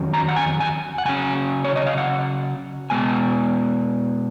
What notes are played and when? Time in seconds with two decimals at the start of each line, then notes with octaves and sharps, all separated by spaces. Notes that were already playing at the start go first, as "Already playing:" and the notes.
Already playing: F2 D#3 F#3 C#4
0.14 A#5
0.28 F#5
0.36 G#5
0.60 G#5
0.98 F#5
1.05 C#3 F#3 C#4 G#5
1.64 C#5
1.76 D#5
1.87 F5
1.98 F#5
2.90 B2 G#3 B3 G#5